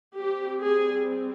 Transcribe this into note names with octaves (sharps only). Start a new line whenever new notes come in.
G3 C4 G4
G#4